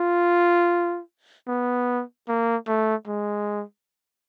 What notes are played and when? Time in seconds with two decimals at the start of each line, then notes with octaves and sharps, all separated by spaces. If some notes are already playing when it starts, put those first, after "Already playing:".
Already playing: F4
1.48 B3
2.28 A#3
2.67 A3
3.07 G#3